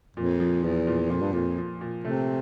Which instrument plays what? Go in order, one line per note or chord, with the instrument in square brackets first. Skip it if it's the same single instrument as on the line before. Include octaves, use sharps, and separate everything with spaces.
[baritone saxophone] F2 [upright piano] A#2
[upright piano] F3
[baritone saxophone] E2 [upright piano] F3
[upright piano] A#2
[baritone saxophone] F2 [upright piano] A#2
[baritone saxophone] G2
[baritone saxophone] F2 [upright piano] A#2
[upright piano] F3
A#2
[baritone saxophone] C3 [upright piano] A3